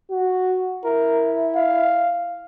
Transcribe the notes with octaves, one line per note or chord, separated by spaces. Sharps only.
F#4
E4 A#4
F5